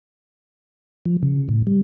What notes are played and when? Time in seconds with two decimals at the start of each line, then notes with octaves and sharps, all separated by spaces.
1.06 F3
1.23 C#3
1.49 A2
1.67 G3